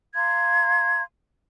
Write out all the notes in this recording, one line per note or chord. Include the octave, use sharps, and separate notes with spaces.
F5 A#5 C6 G#6